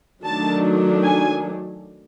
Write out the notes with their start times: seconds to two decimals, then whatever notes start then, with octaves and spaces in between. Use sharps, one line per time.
0.24 D#3 F#3 A3 D4 A5
1.03 G#5